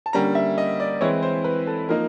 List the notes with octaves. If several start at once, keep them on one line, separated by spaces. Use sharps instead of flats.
A5
D3 G3 A#3 C#4 A#5
E5
D#5
D5
E3 G#3 C4 E4 C#5
C5
B4
A4
F3 A#3 D#4 A#4